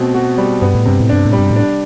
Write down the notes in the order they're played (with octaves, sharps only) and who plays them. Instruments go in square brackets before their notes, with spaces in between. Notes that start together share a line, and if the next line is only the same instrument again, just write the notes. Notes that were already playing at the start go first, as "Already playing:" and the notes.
Already playing: [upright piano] B2 A3 C4
F#4
G3
[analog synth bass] G2 [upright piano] B3
[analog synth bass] A2
[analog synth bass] G2 [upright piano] C3
[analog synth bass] A2
[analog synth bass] G2 [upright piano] D4
[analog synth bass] A2
[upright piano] G3
[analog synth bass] G2
A2
[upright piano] D4